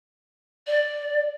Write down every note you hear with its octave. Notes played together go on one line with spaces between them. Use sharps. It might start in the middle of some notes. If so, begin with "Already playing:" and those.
D5